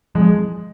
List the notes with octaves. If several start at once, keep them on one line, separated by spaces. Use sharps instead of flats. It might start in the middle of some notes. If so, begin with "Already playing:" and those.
F3 G#3